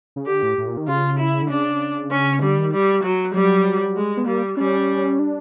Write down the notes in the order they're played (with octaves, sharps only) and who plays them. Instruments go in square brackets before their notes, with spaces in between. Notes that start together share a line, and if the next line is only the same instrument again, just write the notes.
[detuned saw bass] C#3
[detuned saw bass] D3 [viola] G4
[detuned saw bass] A2
A2
A#2
D#3
[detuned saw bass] C#3 [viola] F4
[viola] E4
[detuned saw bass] D3
[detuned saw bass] C#3 [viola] D4
[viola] C#4
[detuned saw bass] D3 [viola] G3
[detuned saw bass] D#3
[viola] G3
F#3
[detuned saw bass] F#3 [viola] G3
[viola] G#3
[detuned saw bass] B3
[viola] G3 [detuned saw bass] A#3
[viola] G3 [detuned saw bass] C#4
[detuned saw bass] D4